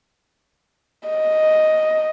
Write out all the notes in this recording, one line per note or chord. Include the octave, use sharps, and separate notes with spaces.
D#5